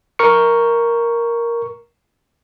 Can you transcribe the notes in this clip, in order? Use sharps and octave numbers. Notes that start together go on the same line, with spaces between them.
A#4 C#6 C#7